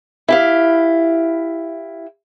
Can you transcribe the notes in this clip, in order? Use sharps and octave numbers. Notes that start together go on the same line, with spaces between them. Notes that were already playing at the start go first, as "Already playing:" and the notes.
E4 G4 F5